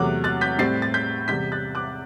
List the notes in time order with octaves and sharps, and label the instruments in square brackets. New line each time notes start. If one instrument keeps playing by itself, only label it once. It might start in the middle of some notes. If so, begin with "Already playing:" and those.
Already playing: [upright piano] E2 C3 F#3 A3 D6 F#6
F#6 A6
G6 B6
A2 G3 C4 A6 C7
A6
G6 B6
E2 C3 G3 G6 B6
F#6 A6
D6 F#6